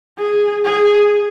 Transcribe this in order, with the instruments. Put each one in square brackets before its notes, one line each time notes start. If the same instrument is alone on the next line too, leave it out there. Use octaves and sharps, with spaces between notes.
[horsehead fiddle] G#4
G#4